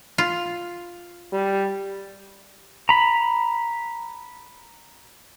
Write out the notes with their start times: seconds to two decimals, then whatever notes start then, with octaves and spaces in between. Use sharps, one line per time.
0.18 F4
1.33 G3
2.89 A#5 B5